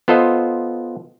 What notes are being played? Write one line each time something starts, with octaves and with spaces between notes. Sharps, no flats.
B3 F4 A4 C5 D#5